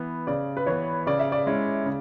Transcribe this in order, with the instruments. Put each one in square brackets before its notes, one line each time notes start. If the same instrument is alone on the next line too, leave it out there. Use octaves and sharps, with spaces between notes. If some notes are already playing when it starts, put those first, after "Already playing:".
Already playing: [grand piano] E3 B3
[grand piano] C#3 [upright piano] D5
[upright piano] B4
[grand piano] E3 B3 [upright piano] C#5
[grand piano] C#3 [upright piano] D5
[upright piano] E5
D5
[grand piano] G#3 C#4 E4
C#3